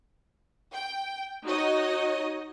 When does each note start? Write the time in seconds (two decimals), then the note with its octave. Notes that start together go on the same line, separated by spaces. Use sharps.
0.75 G5
1.46 D#4 F#4 C#5 D#5